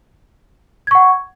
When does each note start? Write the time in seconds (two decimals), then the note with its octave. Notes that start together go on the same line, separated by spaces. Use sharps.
0.87 G#6
0.91 C#6
0.95 F#5